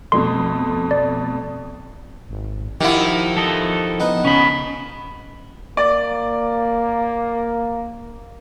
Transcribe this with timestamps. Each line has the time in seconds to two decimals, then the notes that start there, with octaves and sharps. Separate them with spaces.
0.12 F2 B2 A3 C6
0.91 D5
2.29 G#1
2.81 D#3 F3 E4 G4 F#5
3.37 F3 A4 D#5
4.00 B3 D#4
4.25 C#3 C#4 B5
5.77 A#3 D5